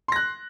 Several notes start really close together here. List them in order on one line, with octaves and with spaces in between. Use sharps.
C6 A#6 F#6